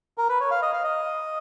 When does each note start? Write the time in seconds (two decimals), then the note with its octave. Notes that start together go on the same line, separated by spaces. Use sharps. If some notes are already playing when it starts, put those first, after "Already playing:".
0.18 A#4
0.29 B4
0.40 C#5
0.51 F5
0.62 D#5
0.73 F5
0.84 D#5